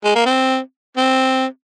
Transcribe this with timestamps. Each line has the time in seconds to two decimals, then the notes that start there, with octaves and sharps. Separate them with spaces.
0.04 G#3
0.15 A#3
0.26 C4
0.97 C4